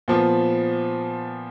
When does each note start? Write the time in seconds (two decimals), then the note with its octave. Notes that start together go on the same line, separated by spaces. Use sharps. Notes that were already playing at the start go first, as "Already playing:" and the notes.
0.08 A#2 F3 B3